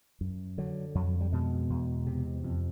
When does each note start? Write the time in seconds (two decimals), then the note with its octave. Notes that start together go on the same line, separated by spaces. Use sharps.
0.21 F#2
0.58 D3 F#3
0.95 F2 F#3
1.21 G3
1.32 B2 G#3
1.70 E2
2.06 C3
2.44 F2